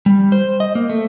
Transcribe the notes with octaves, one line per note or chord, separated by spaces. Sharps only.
G3
C5
D#5
A#3
A3